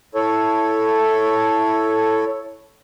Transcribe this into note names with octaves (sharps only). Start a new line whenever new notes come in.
E4 A4 C#5